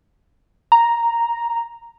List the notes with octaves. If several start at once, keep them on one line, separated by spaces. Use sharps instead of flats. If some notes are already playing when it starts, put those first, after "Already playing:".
A#5